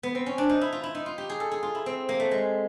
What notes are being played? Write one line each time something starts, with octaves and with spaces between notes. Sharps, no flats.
B3
C4
C#4
D4
D#4
E4
F4
E4
D#4
F4
G4
G#4
A4
G#4
F4
E4
C4
A#3
A3
G#3